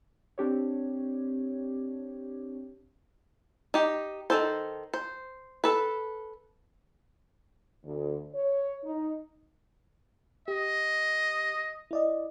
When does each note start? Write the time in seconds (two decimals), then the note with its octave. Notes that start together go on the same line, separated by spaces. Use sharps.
0.38 C4 D4 G4 C#5
3.74 D#4 G4
4.30 D#3 A#3 A4 C5
4.94 C5
5.64 A4 B4
7.85 D2
8.34 C#5
8.84 D#4
10.48 G4 D#5
11.91 E4 D5 D#5